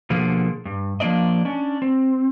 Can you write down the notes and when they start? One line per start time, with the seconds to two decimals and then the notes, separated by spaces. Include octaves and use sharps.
0.10 B2 D3 F3 A#3 G#4
0.65 G2
1.00 F3 A#3 C#4 D4 D5 D#5
1.45 C#4 D4
1.82 C4